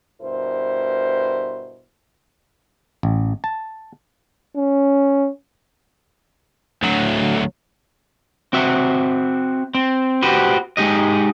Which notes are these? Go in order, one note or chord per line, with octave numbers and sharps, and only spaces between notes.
G2 B2 E4 A#4 C5
A1
A5
C#4
D2 F#3
C4 F#4 E5
C4
F#4 G4 B4 C5
G#3 D#4 G4 D#5